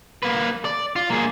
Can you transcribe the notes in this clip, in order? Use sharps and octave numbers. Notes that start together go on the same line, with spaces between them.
A#3 B4
D5
F4
A#3 G#4